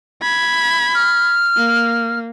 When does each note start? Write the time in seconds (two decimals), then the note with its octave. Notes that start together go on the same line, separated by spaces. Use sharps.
0.22 B5 G#6
0.95 F6
1.57 A#3